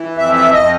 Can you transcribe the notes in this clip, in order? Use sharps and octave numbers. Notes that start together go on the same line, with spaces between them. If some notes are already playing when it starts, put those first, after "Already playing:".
Already playing: E3
F2 E5
E5
F2 D#5